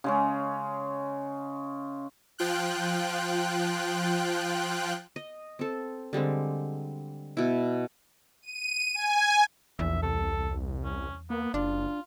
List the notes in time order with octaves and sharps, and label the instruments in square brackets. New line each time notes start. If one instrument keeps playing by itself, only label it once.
[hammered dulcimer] C#3 G#3 C#4
[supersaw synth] F3 F4 G5 F#6
[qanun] D#5
C4 A4
D3 G3 G#3 C4
B2 E4
[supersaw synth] D#7
G#5
[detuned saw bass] A#1 [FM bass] E2 [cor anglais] E5
[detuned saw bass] C2 [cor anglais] A4
[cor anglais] C#4
[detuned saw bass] A#3 [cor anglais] B3
[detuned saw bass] F#1 [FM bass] D4 [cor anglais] F4